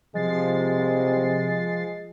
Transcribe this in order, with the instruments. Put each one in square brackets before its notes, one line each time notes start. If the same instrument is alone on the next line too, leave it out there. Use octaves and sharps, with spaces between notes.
[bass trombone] C3 [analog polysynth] F3 A6 C7 [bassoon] G#3